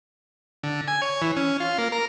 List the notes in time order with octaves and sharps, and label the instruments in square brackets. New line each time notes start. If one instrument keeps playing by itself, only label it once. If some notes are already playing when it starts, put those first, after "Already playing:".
[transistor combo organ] D3
G#5
C#5
E3
C#4
F4
A#3
A#4